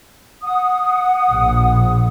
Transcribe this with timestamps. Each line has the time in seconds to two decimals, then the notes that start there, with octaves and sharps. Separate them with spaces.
0.42 F#5 D#6
1.29 A#1